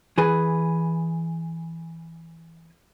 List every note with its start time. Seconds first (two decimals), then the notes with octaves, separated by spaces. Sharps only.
0.18 E3 G#4 B4